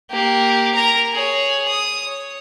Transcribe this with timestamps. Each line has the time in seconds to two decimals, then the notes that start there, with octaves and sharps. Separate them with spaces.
0.11 A#3 G4
0.75 A#4 A#5
1.12 G#4 C#5
1.68 D#6
2.06 C#5